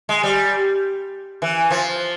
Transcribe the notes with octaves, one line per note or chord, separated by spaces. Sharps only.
G#3
G3
E3
F3